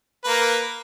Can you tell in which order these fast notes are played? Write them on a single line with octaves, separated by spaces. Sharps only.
B4 A#3 A#4